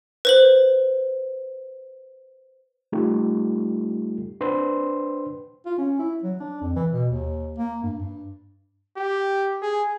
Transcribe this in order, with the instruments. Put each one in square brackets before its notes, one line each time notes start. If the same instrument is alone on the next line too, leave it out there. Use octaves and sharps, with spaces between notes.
[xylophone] B4 C5 F#7
[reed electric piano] G3 A3 D#4 F4 G4 A4
D4 B4 C5 C6
[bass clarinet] F4
C#4
E4
F#3
D4
F2
E3
B2
D#2
A#3
G2
G2
[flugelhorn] G4
G#4